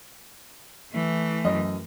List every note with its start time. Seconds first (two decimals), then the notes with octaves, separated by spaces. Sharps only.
0.92 E3 A3
1.45 F#2 D#5